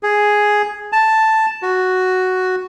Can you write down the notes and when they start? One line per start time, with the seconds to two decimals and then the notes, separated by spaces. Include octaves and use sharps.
0.03 G#4
0.93 A5
1.62 F#4